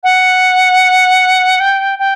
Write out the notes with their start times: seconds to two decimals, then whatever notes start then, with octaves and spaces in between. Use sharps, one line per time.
0.04 F#5
1.60 G5
1.99 G5